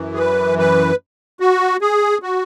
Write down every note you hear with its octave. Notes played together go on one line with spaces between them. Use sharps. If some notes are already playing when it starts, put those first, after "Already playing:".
Already playing: F#2 E3
G#4
B4
B4
F#4
G#4
F#4